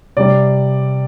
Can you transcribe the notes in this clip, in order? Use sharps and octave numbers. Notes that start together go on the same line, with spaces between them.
C3 G3 D5